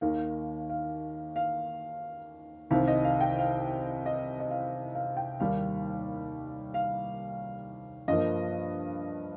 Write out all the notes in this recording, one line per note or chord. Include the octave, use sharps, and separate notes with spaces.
D#2 D#3 A#3 F5
F5
F5
C2 C3 D#3 F5
D#5
F5
G5
F5
D#5
D#5
F5
F5
G5
D#2 D#3 G3 A#3 F5
F5
G2 F3 A#3 D#5